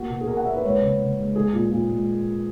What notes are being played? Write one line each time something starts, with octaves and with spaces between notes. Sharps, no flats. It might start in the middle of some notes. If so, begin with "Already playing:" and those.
Already playing: A#3 F#4
B2
G#4
B2 A#4
F#5
A#3 E5
B4
G#3 C#5
B4
C#3
C#3
G#3
G#3 G#4
A#2
A#2
G#3